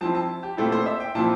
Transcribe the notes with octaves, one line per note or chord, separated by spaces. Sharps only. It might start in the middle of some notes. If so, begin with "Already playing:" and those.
F3 C4 E4 A5
A5
G4
A#2 A3 C4 E4 A4
C5
E5
G5
A#2 F3 C4 E4 A5